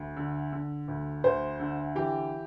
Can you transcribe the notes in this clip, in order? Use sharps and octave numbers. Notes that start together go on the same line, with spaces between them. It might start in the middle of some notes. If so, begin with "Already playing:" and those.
Already playing: D2
D3
D3
D2
D2 C5
D3
E3 G4